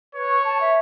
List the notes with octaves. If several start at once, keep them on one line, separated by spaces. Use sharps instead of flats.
B4 C#5
C#6
A5
E5